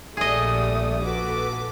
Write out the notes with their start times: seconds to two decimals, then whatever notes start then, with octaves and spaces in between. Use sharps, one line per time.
0.17 A#1 G3 A3 G#4 D5 D#5 D#6
1.05 F#4 A4 B4 D6